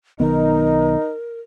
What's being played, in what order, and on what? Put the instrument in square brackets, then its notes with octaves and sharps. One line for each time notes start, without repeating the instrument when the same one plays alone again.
[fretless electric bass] B1 D#3 B3 [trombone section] D#4 [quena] A#4